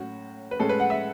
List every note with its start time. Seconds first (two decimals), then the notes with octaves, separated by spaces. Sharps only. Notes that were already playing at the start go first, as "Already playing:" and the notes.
Already playing: A2 F#3 C#4 F#4
0.51 B4
0.59 A2 G#3 C#4 A4
0.69 B4
0.80 F#5
0.90 E5